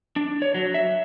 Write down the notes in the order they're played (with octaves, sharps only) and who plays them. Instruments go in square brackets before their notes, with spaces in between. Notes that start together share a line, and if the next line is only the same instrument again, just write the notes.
[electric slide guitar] D4
C#5
F#3
E5